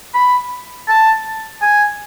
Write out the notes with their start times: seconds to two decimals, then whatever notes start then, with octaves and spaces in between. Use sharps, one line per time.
0.15 B5
0.88 A5
1.62 G#5